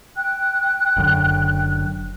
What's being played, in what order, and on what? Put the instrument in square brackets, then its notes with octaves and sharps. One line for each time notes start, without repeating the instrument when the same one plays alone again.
[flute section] G5 F#6
[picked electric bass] F#1 F#2 D3